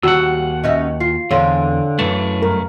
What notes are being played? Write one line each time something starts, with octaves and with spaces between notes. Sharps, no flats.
D#2 G3 F#4 F#5 E6
C#4 D#4 D#5 E5
F4 C7
E2 D3 C4 C#5 F5 C6
F#2 E3 A3
G2 A#4